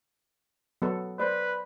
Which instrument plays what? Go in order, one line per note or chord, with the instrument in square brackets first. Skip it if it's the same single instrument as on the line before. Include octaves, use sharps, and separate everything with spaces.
[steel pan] F#3 B3 A4
[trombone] B4 [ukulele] C5 D5